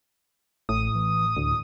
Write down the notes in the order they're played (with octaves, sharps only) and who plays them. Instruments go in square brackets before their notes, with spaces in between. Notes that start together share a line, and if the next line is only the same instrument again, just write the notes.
[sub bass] A1 [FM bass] A2 [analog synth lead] D#6
[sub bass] E3
[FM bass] D2 [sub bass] A2